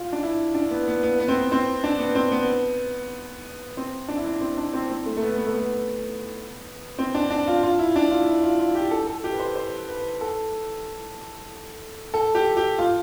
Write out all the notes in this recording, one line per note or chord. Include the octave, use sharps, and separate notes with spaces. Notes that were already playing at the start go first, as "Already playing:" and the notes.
Already playing: F4
D4
E4
D4
B3
B3
B3
B3
C4
B3
C4
D4
B3
C4
B3
C4
D4
E4
D4
C4
D4
C4
C4
A3
A3
B3
B3
A3
B3
C4
D4
D4
F4
F4
E4
D4
F4
E4
F4
F4
G4
A4
A4
G4
B4
C5
C5
B4
A4
A4
G4
G4
F4